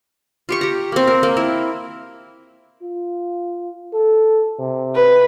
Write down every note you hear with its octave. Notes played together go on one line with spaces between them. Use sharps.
F4 G4 C#6
G4 A#5
A#3 C4
A#4
A#3
E4 A#4
F4
A4
C3
B4